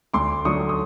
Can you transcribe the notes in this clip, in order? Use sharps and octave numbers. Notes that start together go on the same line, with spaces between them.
D2 C6 D6
D3 F#3 A3 C#6 D#6
D#6